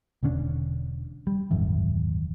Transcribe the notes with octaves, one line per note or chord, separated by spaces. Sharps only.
E1 D3 C#4 D4
G3
D#1 G#1 F#2 E3